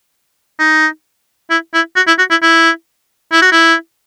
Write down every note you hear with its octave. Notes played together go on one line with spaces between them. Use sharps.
D#4
E4
E4
F#4
E4
F#4
E4
E4
E4
F#4
E4